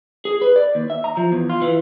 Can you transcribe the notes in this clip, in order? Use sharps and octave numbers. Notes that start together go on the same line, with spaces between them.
G#4
B4
D5
D#2
E5
A#5
F3
E2
F4
E3